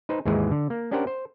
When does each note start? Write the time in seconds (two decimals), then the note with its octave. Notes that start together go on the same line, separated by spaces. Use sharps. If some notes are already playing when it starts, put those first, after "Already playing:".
0.09 D#4 B4 C5
0.26 D#2 G#2 E3 G#3 G#4
0.51 D3
0.70 A#3
0.91 C#4 D4 G4 A#4 C5 F#5
1.07 C5